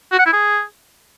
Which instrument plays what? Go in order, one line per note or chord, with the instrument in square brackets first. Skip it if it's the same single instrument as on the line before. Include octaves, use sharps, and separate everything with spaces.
[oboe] F#4
F#5
E4
G#4